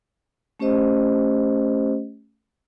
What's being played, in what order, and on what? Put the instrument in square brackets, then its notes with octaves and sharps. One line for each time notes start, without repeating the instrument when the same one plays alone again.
[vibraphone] A3 C#4 G4 C5 D#5